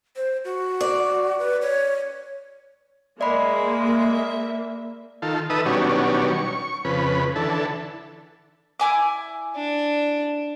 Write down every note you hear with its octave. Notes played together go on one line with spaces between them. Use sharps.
C5
F#4
D5
B4
C#5
G#3 A#3 D5 E5 B5
D#3 F4 A4
D#3 A4 B4 E5 D#6
B2 D#3 F#3 G3 C#4 D4
C#6
F2 C#3 B4
D3 E3 A4
E4 G#5 D6
D4